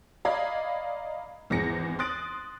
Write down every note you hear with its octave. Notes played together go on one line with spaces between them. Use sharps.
D5 D#5 F5 A#5 B5 G#6
G#1 E2 G#4 A#6 C#7
C6 D#6 F#6 A6 D7 F#7